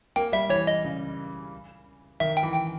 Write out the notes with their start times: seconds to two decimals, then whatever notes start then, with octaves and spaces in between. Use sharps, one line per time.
0.16 A#3 G5
0.32 G3 E5
0.49 E3 C#5
0.67 D#5
0.84 C#3
2.20 D#3 E5
2.37 G5
2.43 E3
2.54 G5